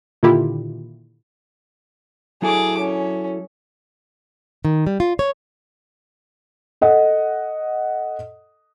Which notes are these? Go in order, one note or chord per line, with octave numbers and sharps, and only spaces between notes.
A#2 D3 D#3 E4 F4 G4
F#3 E4 G#4 A4 D6
C#4
D#3
G3
F4
C#5
A4 D#5 F#5